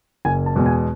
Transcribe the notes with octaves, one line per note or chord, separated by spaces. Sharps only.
F#1 G#5
A5
E2 B2 G#3
G#5